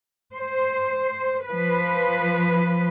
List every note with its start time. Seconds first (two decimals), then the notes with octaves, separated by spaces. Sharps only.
0.35 C5
1.47 F3 B4